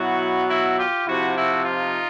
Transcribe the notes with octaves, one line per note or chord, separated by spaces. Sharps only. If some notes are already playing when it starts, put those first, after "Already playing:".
Already playing: B2 F#3 E4 F#4
E4 F#4
F4 G4
C3 F3 E4 F#4
E4 F#4
D#4 F4